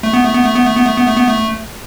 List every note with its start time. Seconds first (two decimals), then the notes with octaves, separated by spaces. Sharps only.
0.03 A3
0.13 B3
0.24 A3
0.34 B3
0.44 A3
0.55 B3
0.65 A3
0.76 B3
0.86 A3
0.97 B3
1.07 A3
1.17 B3
1.28 A3